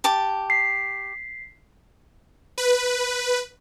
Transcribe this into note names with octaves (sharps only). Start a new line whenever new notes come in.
G4 A5 D6
B6 C7
B4